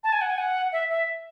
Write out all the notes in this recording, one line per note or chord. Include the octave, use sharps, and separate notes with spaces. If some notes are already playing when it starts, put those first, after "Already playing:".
A5
G#5
F#5
G#5
F#5
E5
E5